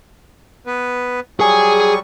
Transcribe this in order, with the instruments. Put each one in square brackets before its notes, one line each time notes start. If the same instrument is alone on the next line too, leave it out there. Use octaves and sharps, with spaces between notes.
[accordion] B3 B4
[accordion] F#3 G3 C#6 [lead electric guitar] G#4 G#5